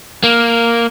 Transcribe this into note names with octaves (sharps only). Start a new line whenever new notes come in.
A#3